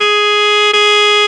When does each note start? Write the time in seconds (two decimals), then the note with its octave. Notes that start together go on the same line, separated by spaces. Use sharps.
0.01 G#4
0.74 G#4